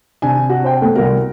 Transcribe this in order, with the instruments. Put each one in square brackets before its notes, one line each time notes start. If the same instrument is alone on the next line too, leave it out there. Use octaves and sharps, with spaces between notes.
[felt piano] C3 D4 [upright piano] G#5
[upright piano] F#4
C5 G5
A3 B3
[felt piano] C2 A#4 [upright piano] F#4